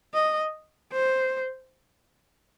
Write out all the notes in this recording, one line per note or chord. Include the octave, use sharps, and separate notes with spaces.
D#5
C5